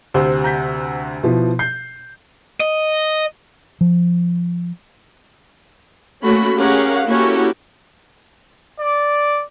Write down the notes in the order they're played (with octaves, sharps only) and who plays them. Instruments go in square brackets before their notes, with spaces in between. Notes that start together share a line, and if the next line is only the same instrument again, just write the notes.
[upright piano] D2 C3 C5
[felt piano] A#5 G6 B6
B2 F3 E4
[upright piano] G6 [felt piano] C7
[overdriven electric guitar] D#5
[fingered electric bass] F3
[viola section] A3 A#3 C#4 F#4 B5
C#4 G4 G#4 A#4 F5 F#5
A#3 C#4 E4 F#4 G4 A4
[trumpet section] D5